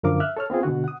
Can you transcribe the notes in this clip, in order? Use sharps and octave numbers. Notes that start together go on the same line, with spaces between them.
F#2 D3 F3 A#4 F5 D6
E5 F6 F#6
A4 C#5 F6
B3 C4 F4 G#4
B2 D3 F#4
F#5 D#6